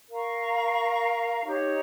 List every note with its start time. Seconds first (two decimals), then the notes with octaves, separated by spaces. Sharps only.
0.09 A#4 F5 A#5 C#6
1.46 D#4 G4 C#5